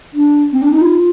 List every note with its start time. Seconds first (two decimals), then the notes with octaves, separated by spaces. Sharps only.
0.14 D4
0.52 C4
0.62 D4
0.72 D#4
0.81 F4